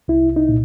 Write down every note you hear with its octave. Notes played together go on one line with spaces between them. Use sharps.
C2 E4
D#4
A#2